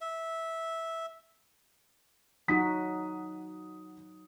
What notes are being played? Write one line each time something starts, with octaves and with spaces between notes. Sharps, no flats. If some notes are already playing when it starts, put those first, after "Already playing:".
E5
F#3 D#4 F#4 F#5 D#6 B6